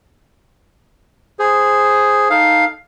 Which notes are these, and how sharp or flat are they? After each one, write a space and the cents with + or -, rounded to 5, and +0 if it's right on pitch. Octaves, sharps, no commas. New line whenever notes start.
G#4 +0 C5 +0
D#4 +0 A4 +0 F5 +5